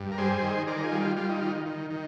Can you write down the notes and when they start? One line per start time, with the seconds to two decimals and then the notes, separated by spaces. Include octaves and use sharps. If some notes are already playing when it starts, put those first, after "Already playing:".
Already playing: G2
0.12 A#4
0.18 G3 G#4 C5
0.42 D#3
0.67 D#3 A#4 D5
0.78 A#4
0.83 F4 G#4
0.92 G3
1.00 F4
1.17 G3 F4
1.29 D#4
1.41 D#3 F4
1.66 D#3
1.91 D#3